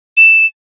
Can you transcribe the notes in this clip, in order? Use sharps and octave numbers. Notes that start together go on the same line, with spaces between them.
E7